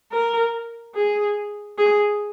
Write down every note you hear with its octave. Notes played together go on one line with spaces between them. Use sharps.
A#4
G#4
G#4